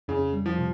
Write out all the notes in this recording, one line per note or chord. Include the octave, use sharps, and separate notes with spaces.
F2 C#3
G3
F3
C3